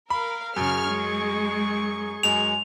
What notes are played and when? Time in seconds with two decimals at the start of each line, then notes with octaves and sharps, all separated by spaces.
0.10 A#4 F5 B5
0.56 F#2 C#3 G#4 C#6 F6
0.87 G#3
2.23 F#2 G#3 F7